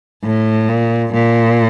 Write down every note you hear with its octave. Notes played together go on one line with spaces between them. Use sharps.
A2
A#2
A#2